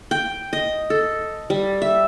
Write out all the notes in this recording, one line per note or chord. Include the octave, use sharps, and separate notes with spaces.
G5
D#5
A4
G3
E5